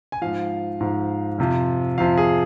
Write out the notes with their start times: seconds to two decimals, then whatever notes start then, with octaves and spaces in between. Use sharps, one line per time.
0.12 G#5
0.22 G#2 F3 F5
0.80 G#2 F3
1.38 F2 C3 F3
1.98 F2 C3 F3 F5
2.18 G#4